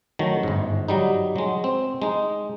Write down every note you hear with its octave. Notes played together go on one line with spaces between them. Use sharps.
D#3 F#3 A3
G1 G#2
F#3 G3 D#4
F#3 G#3
C4
G#3 D#4